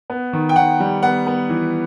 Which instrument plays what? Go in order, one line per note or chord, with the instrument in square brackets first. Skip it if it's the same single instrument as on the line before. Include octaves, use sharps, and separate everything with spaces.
[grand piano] B3
D#3
G5
D#3 F#5
G3
B3 F#5
B3
E3